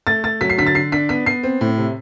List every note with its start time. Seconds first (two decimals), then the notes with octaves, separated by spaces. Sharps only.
0.07 A3 A6
0.24 A3 A6
0.41 F#3 B6
0.50 C7
0.58 D3 B6
0.67 A6
0.75 D3 C7
0.92 D4 B6
1.09 B3 B6
1.26 B3 C7
1.43 C4
1.61 A2
1.78 C3